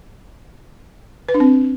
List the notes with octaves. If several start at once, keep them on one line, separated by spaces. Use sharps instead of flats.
B4
D4
C4